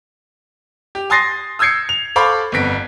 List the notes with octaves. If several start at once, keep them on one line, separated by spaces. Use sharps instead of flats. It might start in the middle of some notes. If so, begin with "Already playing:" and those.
G4
G#5 C6 D#6 A6 A#6 C7
D#6 E6 G6 G#6 C7 C#7
F7
A4 C5 F5 B5 C#6 D6
G1 F2 B3 B6 D7